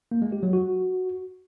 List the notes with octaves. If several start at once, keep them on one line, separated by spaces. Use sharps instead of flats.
A#3
G#3
G4
F#3
F#4